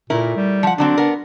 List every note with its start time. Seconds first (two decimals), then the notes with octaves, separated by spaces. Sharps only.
0.10 A#2 A3 E4 A#4
0.36 G3
0.63 F3 F#5
0.78 D3 F#3 C4 D4
0.98 B3 A#4